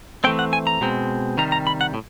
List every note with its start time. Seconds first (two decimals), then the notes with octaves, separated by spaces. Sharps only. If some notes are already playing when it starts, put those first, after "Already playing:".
0.24 E3 A3 C4 G5
0.39 F#5
0.53 G#5
0.67 A#5
0.81 B2 G#3 C4
1.38 C3 D#3 G3 A#5
1.52 A#5
1.67 B5
1.81 F#5
1.94 A2